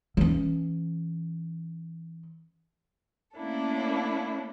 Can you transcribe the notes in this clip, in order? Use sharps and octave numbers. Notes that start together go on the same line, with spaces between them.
E3 C#4
A3 A#3 C#4 D4 E4 A4